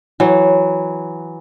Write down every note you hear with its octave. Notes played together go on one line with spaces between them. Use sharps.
E3 F#3